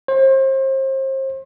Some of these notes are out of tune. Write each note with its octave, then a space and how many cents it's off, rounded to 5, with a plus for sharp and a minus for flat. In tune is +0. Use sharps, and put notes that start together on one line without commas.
C5 +35